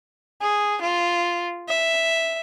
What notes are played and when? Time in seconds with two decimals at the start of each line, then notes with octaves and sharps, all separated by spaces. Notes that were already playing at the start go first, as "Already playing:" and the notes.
0.41 G#4
0.81 F4
1.69 E5